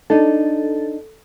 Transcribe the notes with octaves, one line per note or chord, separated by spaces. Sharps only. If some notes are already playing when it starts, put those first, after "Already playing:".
D4 D#4 A4